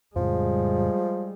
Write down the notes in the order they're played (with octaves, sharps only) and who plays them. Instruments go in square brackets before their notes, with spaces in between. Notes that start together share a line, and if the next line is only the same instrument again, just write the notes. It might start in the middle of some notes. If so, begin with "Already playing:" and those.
[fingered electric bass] F2 A2 C#3 [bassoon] F3 [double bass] G3 G#3